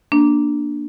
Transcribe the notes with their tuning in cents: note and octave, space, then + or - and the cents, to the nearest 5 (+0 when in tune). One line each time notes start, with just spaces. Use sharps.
A#3 +15 D4 +0